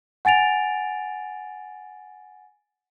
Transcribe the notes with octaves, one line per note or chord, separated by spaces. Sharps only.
F#5 G#5 A6 D7 F7